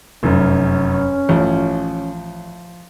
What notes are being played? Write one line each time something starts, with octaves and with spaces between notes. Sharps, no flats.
F1 F#2 C#4
A1 F3